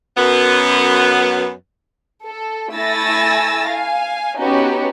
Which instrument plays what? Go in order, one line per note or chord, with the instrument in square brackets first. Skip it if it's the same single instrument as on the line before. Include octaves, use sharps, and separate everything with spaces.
[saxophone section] F#2 B3
[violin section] A4
A3 E4 G#5 E6 A6 A#6
F5 G#5
B3 C#4 D#4 F#4 G4